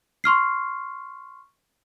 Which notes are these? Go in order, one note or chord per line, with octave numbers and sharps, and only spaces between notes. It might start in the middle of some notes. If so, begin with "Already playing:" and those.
C6 C#6 F6 C7